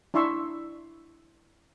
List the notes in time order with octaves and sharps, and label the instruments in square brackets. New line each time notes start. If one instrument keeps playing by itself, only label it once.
[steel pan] D4 E4 E5 C6 C#6 E6